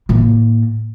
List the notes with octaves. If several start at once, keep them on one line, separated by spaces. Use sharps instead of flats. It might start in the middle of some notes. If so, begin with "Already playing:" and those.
A2 A#3